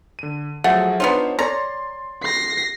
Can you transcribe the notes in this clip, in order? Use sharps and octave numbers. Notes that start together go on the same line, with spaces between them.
D3 D#7
F3 F#3 A3 G#4 F#5
B3 D4 D#4 F4 C5 C#5
C#5 D5 A#5 C6 A6
A#6 C7